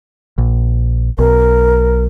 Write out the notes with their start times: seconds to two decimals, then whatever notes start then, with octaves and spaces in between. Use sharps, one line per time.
0.38 A#1
1.18 B1 A#4